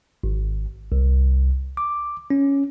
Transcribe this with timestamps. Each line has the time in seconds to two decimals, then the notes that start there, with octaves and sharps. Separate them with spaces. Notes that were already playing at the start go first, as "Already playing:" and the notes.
0.24 G#1
0.92 C2
1.77 D6
2.30 C#4